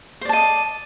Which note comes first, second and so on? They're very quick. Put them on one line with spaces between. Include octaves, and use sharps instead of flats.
C5 D5 A5 D#5